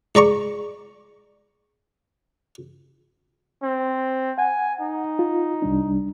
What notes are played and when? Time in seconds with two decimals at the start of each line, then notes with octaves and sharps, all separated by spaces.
0.15 G#2 D5 A#5 C#6
3.63 C4
4.38 F#5 G#5
4.81 D#4
5.19 F4
5.62 C2 G3 D4